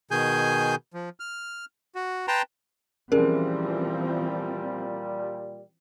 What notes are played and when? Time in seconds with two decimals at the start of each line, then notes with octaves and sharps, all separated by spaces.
0.11 B2 D#3 G#4 G#5 G6
0.94 F3
1.20 F6
1.95 F#4
2.28 B4 G5 A5 A#5 C6
3.12 A#2 E3 F3 G3 C4 C#4 G#4 A#4